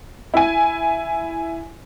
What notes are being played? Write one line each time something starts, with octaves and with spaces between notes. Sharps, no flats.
E4 G#5